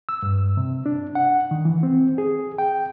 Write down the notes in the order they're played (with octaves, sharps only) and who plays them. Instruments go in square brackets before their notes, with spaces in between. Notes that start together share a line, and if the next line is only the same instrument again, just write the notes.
[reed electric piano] E6
G2
C3
D4
F#5
D#3
E3
C4
G#4
G5